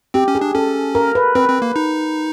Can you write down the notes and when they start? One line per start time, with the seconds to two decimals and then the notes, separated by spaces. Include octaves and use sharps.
0.14 C4 G4
0.28 C#4
0.35 G#4
0.41 D4
0.55 C#4 A4
0.95 A#4
1.15 B4
1.35 C4 B4
1.49 C4
1.62 A#3
1.76 D#4